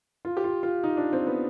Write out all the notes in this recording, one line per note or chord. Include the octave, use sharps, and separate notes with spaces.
F4
G4
F4
F4
D#4
D4
C4
B3